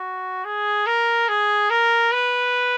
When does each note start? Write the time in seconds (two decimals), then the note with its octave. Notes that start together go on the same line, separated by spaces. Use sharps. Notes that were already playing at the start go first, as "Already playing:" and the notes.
Already playing: F#4
0.45 G#4
0.86 A#4
1.28 G#4
1.70 A#4
2.12 B4